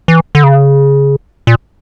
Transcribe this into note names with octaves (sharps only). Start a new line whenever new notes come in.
E3
D3
C#3
A#2